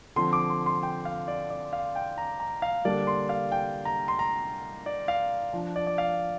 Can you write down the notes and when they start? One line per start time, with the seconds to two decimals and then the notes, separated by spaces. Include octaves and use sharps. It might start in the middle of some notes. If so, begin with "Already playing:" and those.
0.16 D3 F3 C4 C6
0.33 D6
0.50 C6
0.66 C6
0.83 G5
1.05 F5
1.28 D5
1.50 D5
1.73 F5
1.95 G5
2.18 A#5
2.40 A#5
2.62 F5
2.84 D3 G3 A#3 D4 D5
3.07 C6
3.29 F5
3.52 G5
3.85 A#5
4.08 C6
4.19 A#5
4.86 D5
5.08 F5
5.53 F3 D4
5.76 D5
5.87 D5
5.98 F5